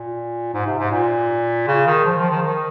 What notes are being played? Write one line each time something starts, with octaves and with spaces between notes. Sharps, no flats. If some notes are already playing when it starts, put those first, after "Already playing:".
Already playing: A#2
G#2
C3
G#2
A#2
C#3
D#3
F3
F3
D#3
D#3